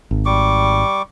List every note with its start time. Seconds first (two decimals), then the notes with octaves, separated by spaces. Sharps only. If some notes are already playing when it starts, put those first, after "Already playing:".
0.11 G#1
0.26 G3 C#6 D6